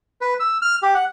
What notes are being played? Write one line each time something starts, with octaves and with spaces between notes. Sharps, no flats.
B4
E6
F6
G4
F#5